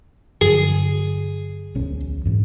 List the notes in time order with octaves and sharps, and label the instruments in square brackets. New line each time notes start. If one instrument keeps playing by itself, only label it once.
[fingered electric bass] G2 D3 F#3 [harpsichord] G#4
[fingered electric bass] D1 B1 C#4
E2 G#2 B2